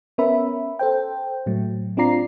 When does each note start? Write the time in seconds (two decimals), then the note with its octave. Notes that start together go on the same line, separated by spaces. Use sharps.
0.18 B3 C#4 A#4 E5 B5
0.79 A4 C5 G5
1.46 A2 F#3 A3
1.97 C4 D4 F4 D5 A#5 C7